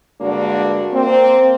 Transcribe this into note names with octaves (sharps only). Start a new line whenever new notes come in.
G2 D3 G#3 A#3 D4 F#4
A#3 C4